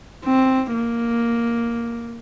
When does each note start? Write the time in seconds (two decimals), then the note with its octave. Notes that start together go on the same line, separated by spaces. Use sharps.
0.25 C4
0.73 A#3